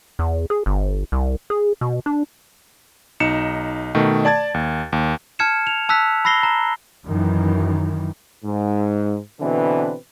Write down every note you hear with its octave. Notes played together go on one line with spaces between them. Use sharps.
E2
G#4
G1
C2
G#4
B2
D4
B1 D#4 C#7 E7
B2 D#3 A3
D5 A5 G#6 A6
D#2
D#2
A5 F6 G#6 C#7 E7
F7
A5 E6 F#6 B6
B5 E6 A#6 C7 G7
A#5
F#2 D#3 E3
G#2
B2 D3 E3 C4 D4 B4